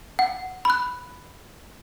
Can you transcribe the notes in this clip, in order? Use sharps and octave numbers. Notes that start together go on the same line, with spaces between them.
F#5
B5 F#6